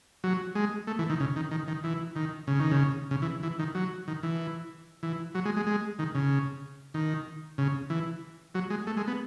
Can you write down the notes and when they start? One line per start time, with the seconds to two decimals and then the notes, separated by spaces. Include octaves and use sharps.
0.24 F#3
0.55 G#3
0.87 A3
0.99 E3
1.10 D#3
1.20 C#3
1.36 D#3
1.51 D#3
1.68 D#3
1.84 E3
2.16 D#3
2.47 C#3
2.60 D#3
2.71 C#3
3.11 C#3
3.22 E3
3.43 E3
3.59 D#3
3.75 F#3
4.08 D#3
4.23 E3
5.03 E3
5.35 F#3
5.45 G#3
5.57 G#3
5.67 G#3
5.99 D#3
6.15 C#3
6.94 D#3
7.58 C#3
7.90 E3
8.55 F#3
8.70 G#3
8.87 A3
8.97 G#3
9.08 B3